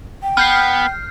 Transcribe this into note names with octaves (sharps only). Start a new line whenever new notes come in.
G5
B3 F6 G6 C7